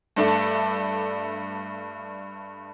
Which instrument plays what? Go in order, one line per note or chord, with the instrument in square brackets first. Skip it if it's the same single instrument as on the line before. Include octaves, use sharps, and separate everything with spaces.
[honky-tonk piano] G2 A3 D4 A4 E5